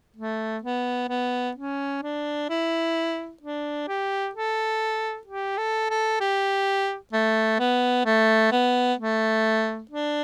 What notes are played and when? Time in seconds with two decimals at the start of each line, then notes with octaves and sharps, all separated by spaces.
0.16 A3
0.63 B3
1.09 B3
1.57 C#4
2.03 D4
2.50 E4
3.42 D4
3.88 G4
4.35 A4
5.27 G4
5.58 A4
5.90 A4
6.21 G4
7.13 A3
7.59 B3
8.06 A3
8.52 B3
8.99 A3
9.91 D4